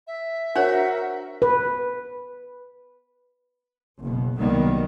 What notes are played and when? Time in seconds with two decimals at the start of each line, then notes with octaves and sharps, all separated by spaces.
0.07 E5
0.56 D4 F#4 A#4 C5 C#5 F#5
1.42 B4
4.00 F#1 B2
4.38 C2 D#3 F#3 G3 A#3 B3